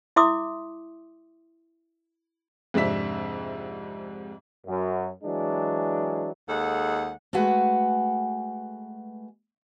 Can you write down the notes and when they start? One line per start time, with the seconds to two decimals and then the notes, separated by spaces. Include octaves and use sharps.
0.16 E4 E5 C6 D6 D#6
2.74 F2 G#2 C3 D4 E5 B6
4.67 F#2
5.24 E3 F#3 G#3 D4
6.49 D#2 G#3 A4 F#5
7.33 G#3 A3 F#4 B4 F#5 G#5